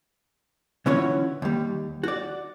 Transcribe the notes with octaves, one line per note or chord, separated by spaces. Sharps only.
D3 E3 C#4 F4 F#4 C#5
D#2 G3
F#4 D5